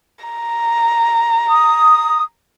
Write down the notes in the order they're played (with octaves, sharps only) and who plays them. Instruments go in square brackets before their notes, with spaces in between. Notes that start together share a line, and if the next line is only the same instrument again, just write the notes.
[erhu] A#5
[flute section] D#6